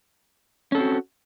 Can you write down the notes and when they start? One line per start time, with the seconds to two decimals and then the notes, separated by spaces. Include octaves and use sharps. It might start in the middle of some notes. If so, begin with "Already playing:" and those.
0.72 C#4
0.75 A4
0.77 C4
0.80 F#4